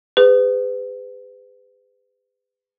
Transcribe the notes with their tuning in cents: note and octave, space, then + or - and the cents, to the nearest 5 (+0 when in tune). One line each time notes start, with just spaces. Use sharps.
G#4 -35 B4 +40